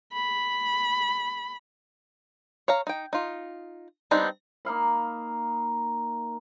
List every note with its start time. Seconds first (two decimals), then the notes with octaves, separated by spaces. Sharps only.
0.13 B5
2.68 C#5 F5 A#5
2.87 D#4 G5
3.13 D#4 F4
4.11 G3 B3 C4 D4 D#4
4.65 A#3 D#4 F5 B5